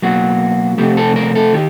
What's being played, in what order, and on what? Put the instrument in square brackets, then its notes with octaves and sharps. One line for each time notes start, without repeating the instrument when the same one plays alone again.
[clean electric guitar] B2 F#3 A#3 F#4
C3 F3 A3 G4
A4
A#4
A4
D#3 G4